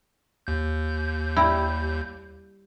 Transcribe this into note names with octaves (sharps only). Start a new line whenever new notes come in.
D#2 G6
G3 E4